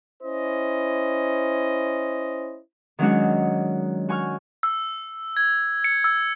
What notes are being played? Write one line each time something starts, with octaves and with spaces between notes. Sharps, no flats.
C#4 E4 C5 D#5
D#3 F#3 G#3 C#4 D4 F#4
F#4 G#5 C#6 F6
E6
G#6
C#7
E6